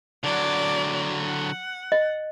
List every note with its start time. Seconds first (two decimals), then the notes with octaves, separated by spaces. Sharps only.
0.24 D3 F#3 D5
1.21 F#5
1.92 D#5